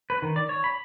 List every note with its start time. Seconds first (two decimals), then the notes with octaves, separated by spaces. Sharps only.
0.10 B4
0.22 D#3
0.36 D5
0.49 C#5
0.64 B5